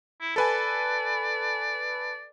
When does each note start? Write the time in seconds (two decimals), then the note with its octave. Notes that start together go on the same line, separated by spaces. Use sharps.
0.21 E4
0.36 A4 B4 D5 G#5